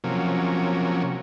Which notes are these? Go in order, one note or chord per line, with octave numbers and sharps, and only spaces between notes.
C3 F3 F#3 A#3 C#4